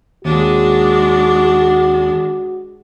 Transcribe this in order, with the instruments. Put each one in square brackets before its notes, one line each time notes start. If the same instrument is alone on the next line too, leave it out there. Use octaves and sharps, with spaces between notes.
[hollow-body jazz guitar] D#2 [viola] G#3 D4 [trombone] F#4